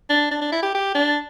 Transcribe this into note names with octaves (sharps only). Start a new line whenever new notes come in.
D4
D4
D4
E4
G4
G4
D4